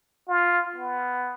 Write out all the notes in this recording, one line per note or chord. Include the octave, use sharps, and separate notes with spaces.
F4
B3